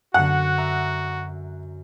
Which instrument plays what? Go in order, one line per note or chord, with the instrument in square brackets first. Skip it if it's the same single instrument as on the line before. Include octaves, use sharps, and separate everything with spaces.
[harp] F#2 D3 [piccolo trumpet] F#4 [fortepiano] F#5
[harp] E5 A#5